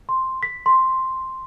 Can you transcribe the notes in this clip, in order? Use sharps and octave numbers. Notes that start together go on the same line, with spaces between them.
C6
B6
C6